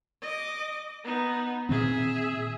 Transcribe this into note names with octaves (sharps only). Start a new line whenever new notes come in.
D#5 D6
B3 D#4
A#2 D#3 C4 G#4 E5